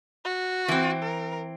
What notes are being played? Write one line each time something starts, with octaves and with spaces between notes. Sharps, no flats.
F#4
E3 C4
A#4